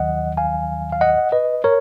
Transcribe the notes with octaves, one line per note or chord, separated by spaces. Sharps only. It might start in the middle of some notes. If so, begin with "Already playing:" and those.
Already playing: D#2 D#3 F#3 D#5 F#5
F5 G#5
F5
D#5 F#5
B4 D#5
A#4 C#5